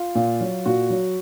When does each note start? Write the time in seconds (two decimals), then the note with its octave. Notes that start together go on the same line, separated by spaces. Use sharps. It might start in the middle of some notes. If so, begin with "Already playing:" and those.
Already playing: F4
0.15 A#2
0.41 F#3
0.66 A#2 F#4
0.90 F#3